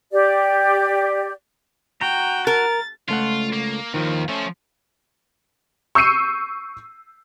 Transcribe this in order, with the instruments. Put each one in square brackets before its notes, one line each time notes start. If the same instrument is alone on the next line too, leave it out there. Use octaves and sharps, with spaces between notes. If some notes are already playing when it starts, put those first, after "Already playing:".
[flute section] G4 D5
[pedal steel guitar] F#4 A#5 [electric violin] G5
[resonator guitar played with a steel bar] A#4 [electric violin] A6
[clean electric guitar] C#2 A3 F#5 [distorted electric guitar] F4
[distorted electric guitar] A#3
[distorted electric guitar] D#2 [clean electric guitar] D#3 F3
[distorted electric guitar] F3 [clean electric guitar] A3 C#4
[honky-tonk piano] C#6 E6 G6 C7 C#7 D#7